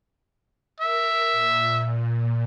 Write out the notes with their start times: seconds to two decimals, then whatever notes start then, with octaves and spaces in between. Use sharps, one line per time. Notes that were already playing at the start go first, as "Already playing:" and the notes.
0.80 A#4 E5
1.33 A#2